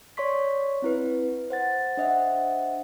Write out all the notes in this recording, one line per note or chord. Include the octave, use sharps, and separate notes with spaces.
C#5 D5 C6 C#6 B6
C4 E4 B4
C5 F#5 A6
D4 C5 D#5 E5 F#5